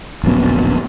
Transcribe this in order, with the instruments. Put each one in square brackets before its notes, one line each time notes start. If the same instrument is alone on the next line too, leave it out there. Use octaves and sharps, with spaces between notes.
[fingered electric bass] D1 A#1 F#2 B3